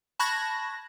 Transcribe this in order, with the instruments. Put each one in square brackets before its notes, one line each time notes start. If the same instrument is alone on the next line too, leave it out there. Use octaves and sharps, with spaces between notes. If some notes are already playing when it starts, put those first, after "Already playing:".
[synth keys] A5 B5 C#6 F#6 G#6 A#6